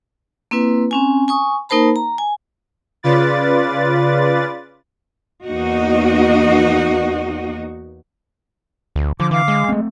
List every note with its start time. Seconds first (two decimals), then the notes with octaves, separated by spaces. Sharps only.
0.51 A#3 C4 E4 B4
0.91 C4 C#4 G#5
1.28 G#5 C#6 D#6
1.69 A#3 D#4 A#4 C5 A5 B5
1.96 A#5
2.18 G#5
3.03 C#3 F4 B4 D5 A6
5.44 E2 A#3 D#4 F#4 D#5
8.96 D2
9.20 D3 F3 D6
9.31 E3 F5 D6
9.48 G#3
9.69 A3 C4